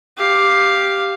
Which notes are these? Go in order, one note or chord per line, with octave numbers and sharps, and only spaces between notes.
G4 F5